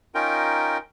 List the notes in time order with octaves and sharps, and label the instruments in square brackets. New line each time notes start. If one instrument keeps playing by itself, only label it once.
[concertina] C#4 D#4 F4 A#4 G5